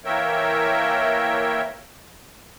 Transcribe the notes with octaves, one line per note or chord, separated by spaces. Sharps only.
E3 A#3 A#4 C#5 E5 G5